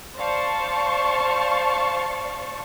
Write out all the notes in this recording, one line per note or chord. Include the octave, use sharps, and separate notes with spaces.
C5 D5 F5 A5 C#6